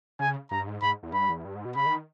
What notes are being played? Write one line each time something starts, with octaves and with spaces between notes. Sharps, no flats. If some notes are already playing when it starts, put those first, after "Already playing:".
C#3 G#5
G2 A#5
G#2
G#2 B5
E2
G2 B5
E2
G2
G#2
B2
C#3 B5
D#3